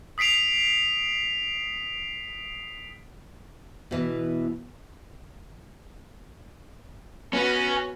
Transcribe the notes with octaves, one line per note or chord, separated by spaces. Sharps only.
D#6 B6 C7 D7 F7
B2 E3
B3 C#4 F#4 B4